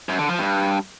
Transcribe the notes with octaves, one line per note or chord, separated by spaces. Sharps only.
F#2
D3
F3
G2